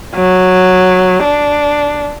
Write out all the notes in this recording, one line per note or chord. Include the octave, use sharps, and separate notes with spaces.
F#3
D4